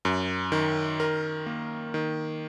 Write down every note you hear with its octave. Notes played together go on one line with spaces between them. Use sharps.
F#2
D#3
A#4
A#3
D#3